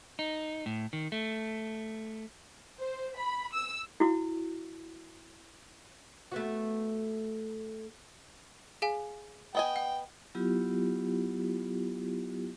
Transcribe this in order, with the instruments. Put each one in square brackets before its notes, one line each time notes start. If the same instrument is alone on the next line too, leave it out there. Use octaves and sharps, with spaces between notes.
[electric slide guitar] D#4
A2
D#3
A3
[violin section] C5
B5
E6
[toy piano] E4 F#4
[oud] A3 B3 F#4
[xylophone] G#4 F5 G#5
[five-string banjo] B3 D#5 G#5 [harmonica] G5
[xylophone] F#5
[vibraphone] F#3 B3 E4 F4 G4